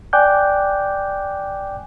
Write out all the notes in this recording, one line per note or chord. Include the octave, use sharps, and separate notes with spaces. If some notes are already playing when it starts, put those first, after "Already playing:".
D5 G5 G#5 D6 F#6 G6